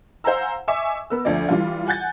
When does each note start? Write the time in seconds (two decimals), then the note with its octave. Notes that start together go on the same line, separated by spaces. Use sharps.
0.24 C5 F5 F#5 G#5 A#5 E6
0.68 D#5 E5 G#5 C#6 D6 E6
1.10 B3 A#4 E6
1.25 D2 F3 D5
1.49 E3 G3 F4
1.87 F#5 G#5 F#6 G6 A6